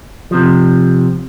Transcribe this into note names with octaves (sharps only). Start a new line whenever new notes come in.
C3 F3